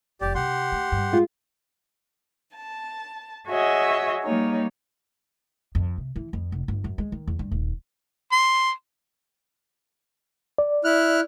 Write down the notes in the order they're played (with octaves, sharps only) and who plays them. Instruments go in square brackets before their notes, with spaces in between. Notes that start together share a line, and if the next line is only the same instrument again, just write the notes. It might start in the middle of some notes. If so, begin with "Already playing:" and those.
[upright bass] F1 F3 [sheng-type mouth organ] G4 D5
[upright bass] C3 D4 [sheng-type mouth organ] G4 F#5 C6
[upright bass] A3 C#4
G2 G3
[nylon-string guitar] G#3 F4
[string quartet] A5
F#4 G#4 C#5 D#5 E5
G3 A#3 D#4 C#5
[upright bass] F2
C3
E3
F2
F1
G1
F#2
G#3
D#3
E2
G2
D#1
[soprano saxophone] C6
[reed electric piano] D5
[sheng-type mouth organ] E4 F6 F#6